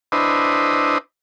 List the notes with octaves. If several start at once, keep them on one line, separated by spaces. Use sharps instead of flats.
D4 E4 B4 C5 D#5